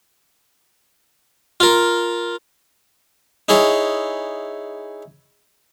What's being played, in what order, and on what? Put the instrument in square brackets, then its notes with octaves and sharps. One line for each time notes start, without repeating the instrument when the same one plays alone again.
[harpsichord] F4 A#4
D#4 E4 G#4 C#5